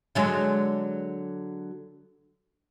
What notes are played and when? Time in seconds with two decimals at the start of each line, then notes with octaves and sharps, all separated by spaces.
0.15 D3 F#3 G#3